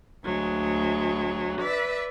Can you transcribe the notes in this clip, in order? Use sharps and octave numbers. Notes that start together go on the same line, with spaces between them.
D2 F#3 G#3
B4 D5 E5